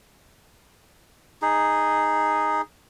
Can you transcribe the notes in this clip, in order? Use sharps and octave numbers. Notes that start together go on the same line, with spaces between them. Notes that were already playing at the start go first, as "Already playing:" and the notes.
D#4 G#4